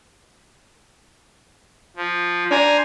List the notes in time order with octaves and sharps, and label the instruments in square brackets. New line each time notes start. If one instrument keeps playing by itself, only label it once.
[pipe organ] F3
[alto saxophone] D4 [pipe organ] C5 G#5 A#5